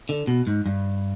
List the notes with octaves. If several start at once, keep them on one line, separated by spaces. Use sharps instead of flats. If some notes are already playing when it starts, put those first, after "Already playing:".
D3
B2
G#2
G2